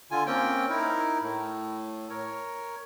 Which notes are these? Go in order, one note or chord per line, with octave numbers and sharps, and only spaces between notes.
D3 F4 G#5
A#3 C4 C#4 G5
D#4 E4 A#4
A2
A#4 C#5